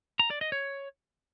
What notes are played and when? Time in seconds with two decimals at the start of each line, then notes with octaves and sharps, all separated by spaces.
0.19 A#5
0.30 D5
0.41 D#5
0.52 C#5